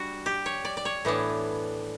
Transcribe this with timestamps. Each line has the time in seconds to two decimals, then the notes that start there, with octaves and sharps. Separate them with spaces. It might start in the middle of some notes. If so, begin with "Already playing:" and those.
Already playing: G3 D4 F#4
0.26 G4
0.46 C#5
0.65 D5
0.77 D5
0.85 C#5
1.05 A2 E3 B3 D4